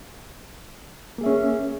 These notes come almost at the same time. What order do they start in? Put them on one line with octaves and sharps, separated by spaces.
A#3 G#4 E5 C#4